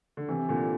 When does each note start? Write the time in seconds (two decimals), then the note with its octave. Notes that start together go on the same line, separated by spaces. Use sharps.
0.17 D3
0.28 C3 E3
0.49 A#2 D3